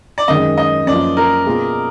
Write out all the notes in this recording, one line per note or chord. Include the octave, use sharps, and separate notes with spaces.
D5
F#2 D#3 G#3 D#5
D#5
F#2 F3 A#3 F4 D5
A#4
B2 A#3 F4 G#4